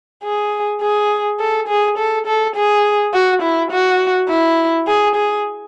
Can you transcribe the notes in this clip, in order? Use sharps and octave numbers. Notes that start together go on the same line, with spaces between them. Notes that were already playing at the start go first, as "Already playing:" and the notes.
G#4
G#4
A4
G#4
A4
A4
G#4
F#4
E4
F#4
E4
G#4
G#4